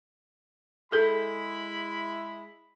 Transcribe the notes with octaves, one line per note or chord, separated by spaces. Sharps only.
G#3 E4 G#4 A4 B5